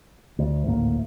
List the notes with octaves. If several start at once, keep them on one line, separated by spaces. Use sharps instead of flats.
D2
G#1 D2 A2 A#3